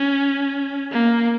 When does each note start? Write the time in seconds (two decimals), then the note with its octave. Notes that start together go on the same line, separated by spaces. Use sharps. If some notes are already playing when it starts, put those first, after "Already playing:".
Already playing: C#4
0.92 A#3